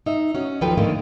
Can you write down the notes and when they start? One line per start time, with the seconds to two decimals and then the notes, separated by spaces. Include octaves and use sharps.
0.06 D#4 E5
0.35 C#4 F#4 C#5
0.61 D#2 F3 F#3 A4 B4 G5
0.77 A2 D3 D#3 F3 A#3